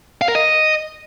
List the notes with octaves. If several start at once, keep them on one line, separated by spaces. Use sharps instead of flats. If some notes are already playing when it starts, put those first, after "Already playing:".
F5
A#4
D#5